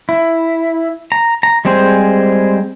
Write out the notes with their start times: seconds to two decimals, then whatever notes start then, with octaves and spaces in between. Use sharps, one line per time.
0.09 E4
1.12 A#5
1.43 A#5
1.65 G3 G#3 C4 G#4 C5